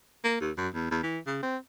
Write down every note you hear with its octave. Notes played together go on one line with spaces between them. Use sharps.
A#3
D#2
F#2
E2
E2
E3
C#3
C4